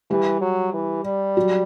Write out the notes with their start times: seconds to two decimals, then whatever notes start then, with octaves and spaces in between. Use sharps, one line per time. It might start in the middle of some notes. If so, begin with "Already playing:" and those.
0.10 E3 G3 G4
0.41 F#3
0.73 E3
1.04 G3
1.37 F#3 F#4